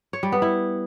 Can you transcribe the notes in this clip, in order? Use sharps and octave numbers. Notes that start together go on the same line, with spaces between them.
C#5
G3
B3
E4